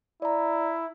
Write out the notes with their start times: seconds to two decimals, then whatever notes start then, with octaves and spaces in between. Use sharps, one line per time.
0.22 E4 D5 A#5